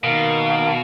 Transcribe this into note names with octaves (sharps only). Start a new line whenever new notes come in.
B2 D#3 A#3 A#4 F5